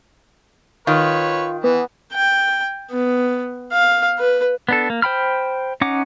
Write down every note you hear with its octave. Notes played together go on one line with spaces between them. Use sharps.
D#3 F4 B4 C#5
E3 B3
G5
B3
F5
B4
B3 D4 A4
A#3
C5 G5 B5 F6
C#4 D#4 F#5 D6